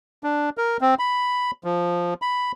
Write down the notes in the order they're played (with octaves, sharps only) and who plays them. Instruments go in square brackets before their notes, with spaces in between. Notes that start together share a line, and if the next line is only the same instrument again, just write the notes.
[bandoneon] D4
A#4
C4
B5
F3
B5